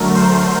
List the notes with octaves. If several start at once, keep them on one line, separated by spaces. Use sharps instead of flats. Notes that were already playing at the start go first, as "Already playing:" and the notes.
Already playing: D3 F#3 A3 A#4
C5